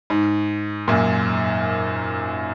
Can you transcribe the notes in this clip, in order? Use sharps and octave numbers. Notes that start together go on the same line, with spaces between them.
G#2
F#2 A#2